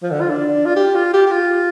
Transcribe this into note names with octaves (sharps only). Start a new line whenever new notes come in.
F3
D3
F4
D4
F4
G4
F4
G4
G4
F4